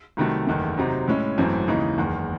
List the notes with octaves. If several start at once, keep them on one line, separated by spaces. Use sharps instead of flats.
C2 C3 D#3 F#3 A3
F#1 E2 D#3 A3
C3 F#3 C4 D#4
A2 G#3 C#4 E4
G#1 F#2 E3 A3 C4
D#2 C#3 E3 G#3 D#4
F#1 E2 D#3